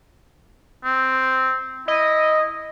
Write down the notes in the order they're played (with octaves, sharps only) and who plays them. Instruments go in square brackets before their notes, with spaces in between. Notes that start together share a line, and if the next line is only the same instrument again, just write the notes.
[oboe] C4
[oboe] E4 [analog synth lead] D#5